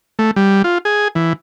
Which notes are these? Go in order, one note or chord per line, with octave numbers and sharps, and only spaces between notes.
A3
G3
F4
G#4
E3